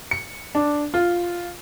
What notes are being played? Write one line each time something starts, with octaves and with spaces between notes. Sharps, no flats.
C#7
D4
F4